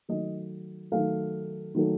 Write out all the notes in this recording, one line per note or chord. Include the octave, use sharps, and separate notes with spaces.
D#3 F#3 A3 D#5
D#3 F#3 A3 F5
D#3 F#3 A3